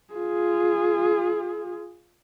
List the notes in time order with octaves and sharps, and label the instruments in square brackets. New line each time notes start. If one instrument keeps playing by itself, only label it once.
[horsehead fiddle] F4 G#4